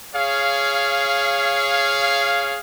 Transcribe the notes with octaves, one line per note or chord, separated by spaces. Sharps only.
G#4 C#5 F5